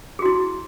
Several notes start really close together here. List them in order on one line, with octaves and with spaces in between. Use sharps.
G#4 F#4 E4